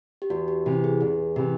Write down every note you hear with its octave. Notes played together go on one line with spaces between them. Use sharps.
G4
E2 F#4
G4
C3 E3 G4
G#4
E2 G#4
C3 E3 G4